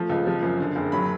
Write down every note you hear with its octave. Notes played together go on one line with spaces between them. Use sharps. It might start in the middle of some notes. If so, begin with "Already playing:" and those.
Already playing: F3 A3
C#2
F3
F#2
D3
F#1
F#3 B5